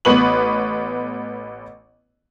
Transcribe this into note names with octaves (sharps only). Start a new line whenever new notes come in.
A1 B3 B4 C#6 F#7